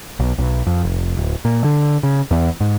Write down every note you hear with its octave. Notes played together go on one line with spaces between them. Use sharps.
B1
B1
F2
F1
D1
A#2
D3
C#3
E2
G#2